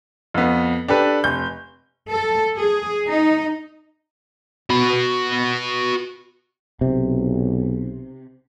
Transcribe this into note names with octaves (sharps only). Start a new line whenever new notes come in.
F2 B3
D4 G4 A4 B4
F1 G6
A4
G#4
D#4
F#4 B5
B1 C3